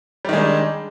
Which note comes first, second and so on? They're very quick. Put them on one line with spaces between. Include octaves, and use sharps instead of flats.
G3 D#3 G#3 D4